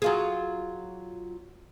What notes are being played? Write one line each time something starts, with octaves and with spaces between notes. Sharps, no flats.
F#3 F4 G#4